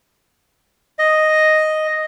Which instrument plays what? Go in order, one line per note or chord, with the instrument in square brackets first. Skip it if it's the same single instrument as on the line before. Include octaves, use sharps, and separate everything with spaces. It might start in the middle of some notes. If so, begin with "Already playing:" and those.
[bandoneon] D#5